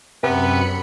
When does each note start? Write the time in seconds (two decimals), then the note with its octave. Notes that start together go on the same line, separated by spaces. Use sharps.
0.23 F#2 C3 B3 B4 B5 C#7